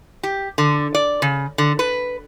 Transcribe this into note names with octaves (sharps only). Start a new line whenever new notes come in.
G4
D3
D5
C#3
D3
B4